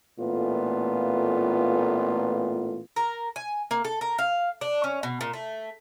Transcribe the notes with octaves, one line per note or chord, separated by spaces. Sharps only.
A1 A#2 A3 B3 F4
A#4
G#5
A#3
A4
A#4
F5
D4
C#4
B2
A#2
A3